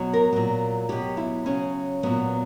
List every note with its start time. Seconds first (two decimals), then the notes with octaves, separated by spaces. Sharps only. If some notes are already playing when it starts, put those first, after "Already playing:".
Already playing: B2 F#3
0.13 A#4
0.33 A#2 F#3
0.89 B2 F#3 G4
1.17 E4
1.46 C#3 F#3 C#4
2.03 A#2 F#3 B3